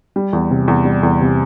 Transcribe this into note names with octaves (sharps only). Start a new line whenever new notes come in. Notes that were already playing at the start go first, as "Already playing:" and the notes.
G3
E2
C3
E2
G3
E2
C3